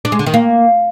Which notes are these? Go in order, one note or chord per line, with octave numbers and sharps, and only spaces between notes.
D4
G#3
D3
D#3
A#3